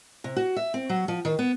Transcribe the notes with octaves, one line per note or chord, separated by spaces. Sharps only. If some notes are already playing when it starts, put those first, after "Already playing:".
C3
F#4
E5
C4
F#3
F3
D#3
B3